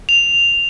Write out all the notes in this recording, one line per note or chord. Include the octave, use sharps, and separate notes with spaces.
F7